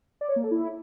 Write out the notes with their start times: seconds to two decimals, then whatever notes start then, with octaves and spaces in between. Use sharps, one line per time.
0.21 D5
0.28 C#5
0.36 A#3
0.44 A4
0.51 E4